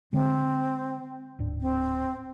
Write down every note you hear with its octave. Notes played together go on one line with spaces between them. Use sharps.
D3 G#3 C4
D1 G#2 D4
C4